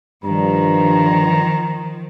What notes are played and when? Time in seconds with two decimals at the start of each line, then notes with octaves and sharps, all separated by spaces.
0.24 G2 D#3 F3 A#5